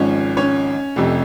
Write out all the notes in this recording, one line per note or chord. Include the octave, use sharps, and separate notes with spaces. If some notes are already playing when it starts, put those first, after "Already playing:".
Already playing: G#1 G#2 F3 C#4 C#5
C#4 C#5
F1 F2 C3